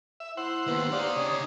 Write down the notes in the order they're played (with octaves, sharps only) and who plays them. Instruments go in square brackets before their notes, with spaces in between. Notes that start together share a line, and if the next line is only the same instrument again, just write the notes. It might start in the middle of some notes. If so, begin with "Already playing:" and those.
[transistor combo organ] E5
[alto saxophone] E4 [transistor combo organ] C5 F#5 [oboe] E6
[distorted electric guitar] D#2 [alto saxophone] B3
[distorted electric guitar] D#4 G4 [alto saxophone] D5 [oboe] F5
[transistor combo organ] C#3 D4 [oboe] G#4